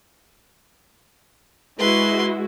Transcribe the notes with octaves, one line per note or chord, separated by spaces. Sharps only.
G#3 E4 F#4 B4 C6